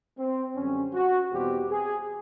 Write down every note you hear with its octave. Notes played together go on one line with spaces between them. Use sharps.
C4
F#2 D3 G3 C#4
F#4
E2 B2 G3 C4 G4
G#4